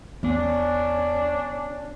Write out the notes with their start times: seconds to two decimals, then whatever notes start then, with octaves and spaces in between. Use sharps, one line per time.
0.23 E2 B3 C#4 D4